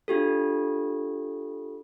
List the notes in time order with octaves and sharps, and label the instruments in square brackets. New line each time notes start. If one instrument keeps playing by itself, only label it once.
[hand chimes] D4 F4 G4 A4